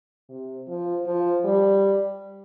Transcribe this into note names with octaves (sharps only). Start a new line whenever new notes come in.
C3
F3
F3
G3